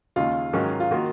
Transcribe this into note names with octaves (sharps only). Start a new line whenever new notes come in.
D#2 C#3 G#3 F4
G#2 D#3 F#3 C#4
F4
D#3 A#3 F4 F#4